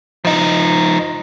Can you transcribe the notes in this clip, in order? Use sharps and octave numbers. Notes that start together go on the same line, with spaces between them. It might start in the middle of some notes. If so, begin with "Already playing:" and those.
F3 D#4